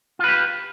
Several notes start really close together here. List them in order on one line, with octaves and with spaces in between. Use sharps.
F4 B4 G4